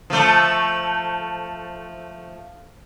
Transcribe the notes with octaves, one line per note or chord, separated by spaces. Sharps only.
F3 A3